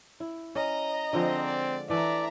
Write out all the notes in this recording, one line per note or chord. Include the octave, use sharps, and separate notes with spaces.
E4
C#4 D#5 A#5
D3 F3 G#3 C4
D5
E3 A3 D5 E5 A#5